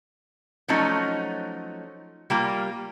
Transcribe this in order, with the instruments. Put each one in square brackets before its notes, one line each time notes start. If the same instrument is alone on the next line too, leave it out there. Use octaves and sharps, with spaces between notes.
[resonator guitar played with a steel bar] F3 F#3 A3 C#4 D#4
G3 A#3 F4